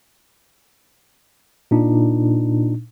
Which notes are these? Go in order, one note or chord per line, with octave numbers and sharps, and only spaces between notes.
A#2 D4 D#4